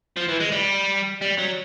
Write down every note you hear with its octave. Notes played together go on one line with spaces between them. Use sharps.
F3
E3
G#3
G3
G3
F#3